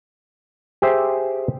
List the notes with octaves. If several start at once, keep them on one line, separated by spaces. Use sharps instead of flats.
G4 G#4 C5 E5